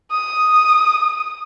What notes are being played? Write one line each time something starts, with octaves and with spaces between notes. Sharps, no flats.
D#6